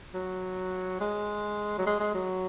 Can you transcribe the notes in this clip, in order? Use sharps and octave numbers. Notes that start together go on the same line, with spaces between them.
F#3
G#3
F#3
G#3
G#3
F#3